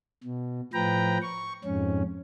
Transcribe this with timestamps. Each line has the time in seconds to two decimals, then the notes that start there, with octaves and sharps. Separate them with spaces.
0.24 B2
0.73 A2 F3 B4 G5 A#5
1.22 C#6
1.64 F2 G#2 C#4